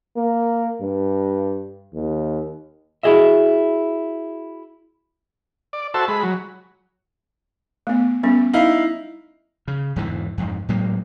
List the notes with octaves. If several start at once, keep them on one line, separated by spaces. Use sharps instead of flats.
A#3
G2
D#2
E4 F#4 G#4 D#5 E5
D5
F#4 A4 C5 E5 A5
G#3 B5
F#3
A3 B3
G3 B3 C#4
D#4 E4 F5
C#3
E2 G#2 D3 E3
F2 G#2
A2 F#3 G#3 A#3